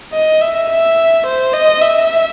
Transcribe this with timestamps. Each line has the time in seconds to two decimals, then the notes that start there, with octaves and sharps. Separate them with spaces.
0.13 D#5
0.41 E5
0.70 E5
1.26 C5
1.54 D#5
1.82 E5